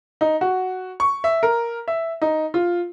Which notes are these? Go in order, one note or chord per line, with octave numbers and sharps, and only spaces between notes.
D#4
F#4
C#6
E5
A#4
E5
D#4
F4